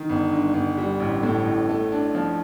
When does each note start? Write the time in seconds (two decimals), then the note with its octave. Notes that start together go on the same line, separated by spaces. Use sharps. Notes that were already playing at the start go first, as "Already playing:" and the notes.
Already playing: D#3
0.09 G1
0.32 G2
0.54 G1
0.78 G3
1.00 A1
1.23 A2
1.46 A1
1.69 A3
1.92 D4
2.15 F3